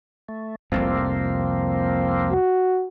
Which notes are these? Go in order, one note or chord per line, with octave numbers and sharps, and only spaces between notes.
A3
F1 C2 F2 F3 A#3 C4
F#4